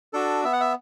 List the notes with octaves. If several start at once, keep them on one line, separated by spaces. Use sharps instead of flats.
D4 F#4 A4
B3 E5
F#5
E5